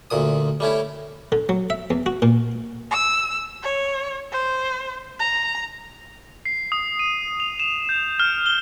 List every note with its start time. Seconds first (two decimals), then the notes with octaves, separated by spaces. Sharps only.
0.10 D2 A#2 D#6
0.60 G3 A3 C#4 E4
1.32 D3
1.49 F#3
1.70 E5
1.90 E2
2.06 F#4
2.22 A#2
2.91 E6
3.63 C#5
4.32 C5
5.19 A#5
6.45 C7
6.72 D#6
6.99 D#7
7.40 F7
7.59 E7
7.89 G6
8.20 F6
8.46 G7